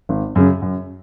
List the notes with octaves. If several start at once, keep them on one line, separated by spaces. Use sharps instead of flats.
G#1
F#2 C#3
F#2